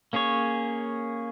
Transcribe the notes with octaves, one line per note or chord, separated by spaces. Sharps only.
A#3 C#4 G#4 C#5